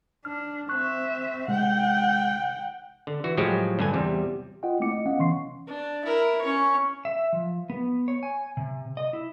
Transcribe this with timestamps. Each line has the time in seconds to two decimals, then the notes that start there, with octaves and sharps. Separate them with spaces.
0.25 D4 F6
0.69 C4 E5 C#6 F#6
1.48 C3 G#3 F#5 G5
3.07 D3
3.24 E3 F#4
3.37 A2 F3 F#3 G#3 F#4 G4
3.79 G2 D3 G#5
3.93 E2 C3 G3
4.63 F4 D#5 F#5 G5
4.80 A3 A#3 C4 E4 D6 C#7
4.91 D#5
5.06 B3 C#4 D#5 F5 F#5
5.19 C3 E3 C#4 C6 C#6 C7
5.67 D4
6.05 E4 A#4
6.41 C#4 C#5
7.05 E5
7.33 F3
7.70 B3
8.08 C#5
8.23 G#5
8.57 C3
8.97 D#5
9.13 E4